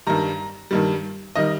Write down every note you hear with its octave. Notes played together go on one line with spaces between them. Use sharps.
G2 D#3 G3 A#5
G2 D#3 G3
D#3 G3 D#5